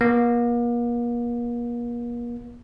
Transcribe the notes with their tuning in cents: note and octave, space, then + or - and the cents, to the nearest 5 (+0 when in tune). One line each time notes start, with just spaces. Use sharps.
A#3 +40